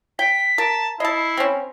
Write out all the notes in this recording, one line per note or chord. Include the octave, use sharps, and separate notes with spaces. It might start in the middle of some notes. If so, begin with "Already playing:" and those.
G5 B6
A#4 A5
E4 D#5 A5 C7
C4 C#4